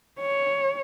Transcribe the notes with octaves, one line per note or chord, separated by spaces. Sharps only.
C#5